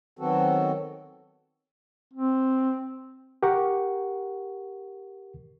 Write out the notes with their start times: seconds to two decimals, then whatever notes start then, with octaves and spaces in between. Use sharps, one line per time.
0.19 D#3 F#3 B3 C4 F#4 A4
2.13 C4
3.43 G4 A#4 F#5 C#6